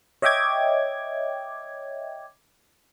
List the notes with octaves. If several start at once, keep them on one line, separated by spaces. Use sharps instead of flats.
C#5 D#5 E5 G5 D6 G#6